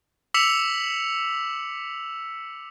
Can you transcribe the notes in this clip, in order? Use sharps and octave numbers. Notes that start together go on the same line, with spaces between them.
D6 E6 B6 C#7 F7 F#7